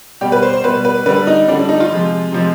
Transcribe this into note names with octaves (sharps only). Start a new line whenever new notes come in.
B2 G3 G4
B4
C5
C5
B2 G3 B4
B4
D3 G3 B4
D#4
D3 G3 D4
D4
D#4
F4
C3 F3 G#3
C3 F3 G#3